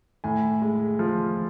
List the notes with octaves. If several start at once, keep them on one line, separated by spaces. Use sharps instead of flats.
A2 G#5
G#3
F3